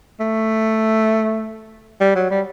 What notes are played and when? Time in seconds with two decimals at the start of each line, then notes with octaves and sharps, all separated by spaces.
0.20 A3
2.01 G3
2.16 F#3
2.31 G3